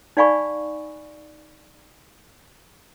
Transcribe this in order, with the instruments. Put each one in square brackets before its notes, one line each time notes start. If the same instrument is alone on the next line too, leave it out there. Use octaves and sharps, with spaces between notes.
[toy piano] D#4 D5 F5 G#5 B5 C#6